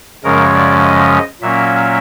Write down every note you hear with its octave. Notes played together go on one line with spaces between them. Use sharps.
F#2 C#3 F3 G#3 C#4 A#4
D5
D#5
A#2 F#3 A#3 C#4 E5